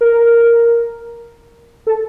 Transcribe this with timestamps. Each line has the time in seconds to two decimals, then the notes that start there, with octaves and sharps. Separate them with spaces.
0.01 A#4
1.87 A4